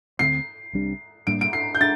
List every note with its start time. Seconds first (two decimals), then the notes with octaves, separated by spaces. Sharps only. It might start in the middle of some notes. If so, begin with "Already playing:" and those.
0.19 D2 D3 A3 C4 C7
0.73 C2 C3 G3 D4
1.27 A2 G3 A#3 D4 D7
1.41 D7
1.53 C7
1.75 G6
1.81 D4 A6